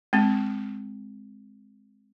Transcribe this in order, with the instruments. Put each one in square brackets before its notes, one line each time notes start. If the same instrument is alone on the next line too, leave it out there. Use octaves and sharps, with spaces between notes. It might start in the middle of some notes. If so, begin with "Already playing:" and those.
[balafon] G#3 C4